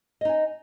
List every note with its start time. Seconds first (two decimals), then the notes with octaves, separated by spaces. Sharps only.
0.21 D#5
0.25 D#4
0.29 G#5